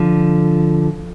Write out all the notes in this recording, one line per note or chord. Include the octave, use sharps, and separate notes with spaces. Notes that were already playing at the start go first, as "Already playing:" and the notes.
Already playing: D3 F3